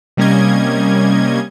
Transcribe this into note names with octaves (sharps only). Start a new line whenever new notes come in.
C3 G3 A#3 C#4 D#5 G#6